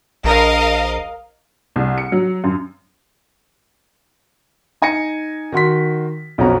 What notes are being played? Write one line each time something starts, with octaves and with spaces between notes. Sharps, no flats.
A#1 A#4 D#5 F5
C2
C#7
F#3
F#2
D#4 G#5 A#6 C#7
D#3 F#4 C6 B6
B1 F2 C#4 F#4 A#5